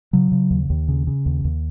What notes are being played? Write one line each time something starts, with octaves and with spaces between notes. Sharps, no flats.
C#3 F#3
C#3
D#2
D#2
C#3
C#3
D#2
D#2